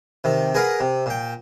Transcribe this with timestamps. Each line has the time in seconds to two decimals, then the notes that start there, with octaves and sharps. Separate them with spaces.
0.24 C3 D#3
0.54 G#4 A#4 B4 F5 F#5
0.80 C3
1.06 A#2 G5